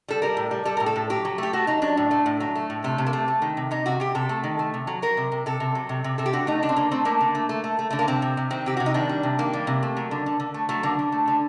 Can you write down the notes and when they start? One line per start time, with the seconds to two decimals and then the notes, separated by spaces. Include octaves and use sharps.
0.08 G3 A4
0.22 G3 A#4
0.37 A2
0.51 G3
0.65 G3 A4
0.77 A2 A#4
0.86 A4
0.96 A2
1.10 F#3 G4
1.25 F#3
1.38 A3 G4
1.53 A3 F#4
1.67 F#3 D#4
1.82 F#3 D4
1.97 A2
2.11 A3
2.26 A2
2.40 F#3
2.55 A3
2.70 A2
2.84 C3 A3
2.98 C3
3.07 A#3
3.13 A3
3.28 A3
3.42 D#3
3.57 C3
3.71 C3 D#4
3.86 C3 F#4
4.00 C3 G4
4.15 C3 A4
4.29 A3
4.44 D#3
4.59 A3
4.74 C3
4.87 F#3
5.02 F#3 A#4
5.17 C3
5.32 C3
5.46 C3 A4
5.60 C3
5.75 F#3
5.89 C3
6.04 C3
6.18 C3 A4
6.26 G4
6.33 D3 F#4
6.47 A3 D#4
6.62 D3 D4
6.69 C4
6.76 D3 A#3
6.91 A3 C4
7.05 A3 A#3
7.21 D3
7.35 A3
7.49 A3
7.64 A3
7.79 A3
7.90 D3 A3
7.99 A#3
8.08 C3 C4
8.22 C3
8.37 C3
8.50 D#3 C4
8.66 C3 G4
8.77 C3 F#4
8.86 D#4
8.94 D#3 D4
9.09 G3
9.23 C3
9.39 D#3 A#3
9.53 G3
9.67 C3
9.83 A3
9.97 F#3
10.11 D3
10.26 D3
10.40 D3
10.54 A3
10.69 F#3 A3
10.83 D3 A#3
10.99 D3
11.12 A3
11.28 D3